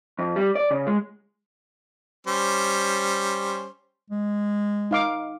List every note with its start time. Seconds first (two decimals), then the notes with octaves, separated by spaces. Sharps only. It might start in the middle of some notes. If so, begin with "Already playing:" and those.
0.19 F2
0.36 G3
0.55 D5
0.71 C#3
0.87 G#3
2.27 G3 C#4 C5
4.10 G#3
4.91 D#4 F5 D6